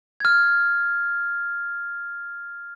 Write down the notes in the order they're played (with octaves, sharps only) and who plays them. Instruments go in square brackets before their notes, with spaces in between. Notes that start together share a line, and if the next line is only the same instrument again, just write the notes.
[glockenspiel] F6 G#6